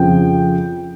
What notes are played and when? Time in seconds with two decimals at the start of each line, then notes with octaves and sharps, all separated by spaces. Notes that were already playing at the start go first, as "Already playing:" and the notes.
Already playing: F2 C#3 F3 G5